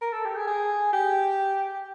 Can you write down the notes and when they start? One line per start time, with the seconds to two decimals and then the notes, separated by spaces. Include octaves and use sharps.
0.02 A#4
0.13 A4
0.25 G4
0.36 G#4
0.47 G#4
0.93 G4